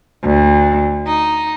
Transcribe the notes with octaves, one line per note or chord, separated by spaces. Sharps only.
D2
D#4